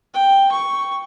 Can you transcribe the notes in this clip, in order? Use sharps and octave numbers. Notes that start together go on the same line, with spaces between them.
G5
C#6